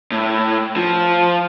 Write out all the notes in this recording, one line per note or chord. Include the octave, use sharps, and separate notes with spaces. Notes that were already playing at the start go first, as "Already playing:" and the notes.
A2
F3